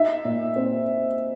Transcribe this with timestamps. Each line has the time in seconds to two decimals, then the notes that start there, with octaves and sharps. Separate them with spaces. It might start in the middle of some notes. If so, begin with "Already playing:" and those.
Already playing: D#4 E5
0.25 A#2
0.56 C4